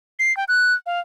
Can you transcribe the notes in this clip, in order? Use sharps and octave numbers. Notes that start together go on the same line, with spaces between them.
C7
G5
F#6
F5